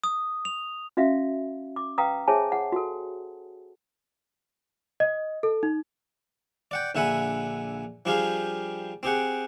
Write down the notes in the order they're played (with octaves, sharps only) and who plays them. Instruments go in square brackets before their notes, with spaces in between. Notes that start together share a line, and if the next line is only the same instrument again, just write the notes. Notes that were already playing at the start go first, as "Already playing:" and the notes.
[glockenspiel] D#6
F7
[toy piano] C#4 F#4 E5 F5
D6
B4 F5 G5 A#5 D#6
G#4 C5 C#5 E5 G#5 A5
G#4 F#5
F#4 A4
[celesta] D#5
A4
D#4
[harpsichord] D5 F#5 G5
A#1 D3 E5 F#5 G#5 B5
F3 G3 D4 G4 G#4 F5
C4 G4 G#4 F#5